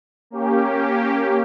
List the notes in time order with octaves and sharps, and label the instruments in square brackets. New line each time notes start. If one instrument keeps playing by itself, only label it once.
[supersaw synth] A#3 C#4 G4